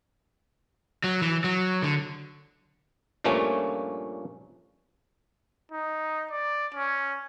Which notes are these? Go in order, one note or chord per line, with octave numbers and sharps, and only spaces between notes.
F#3
E3
F#3
D3
G2 A#2 F3 A3 A#3 C#4
D#4
D5
C#4